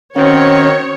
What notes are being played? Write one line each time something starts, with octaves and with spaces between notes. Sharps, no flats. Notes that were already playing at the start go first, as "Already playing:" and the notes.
D#3 C4 C#4 F#4 C#5